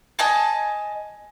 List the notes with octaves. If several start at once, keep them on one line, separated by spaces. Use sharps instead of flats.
D#5 G#5 A5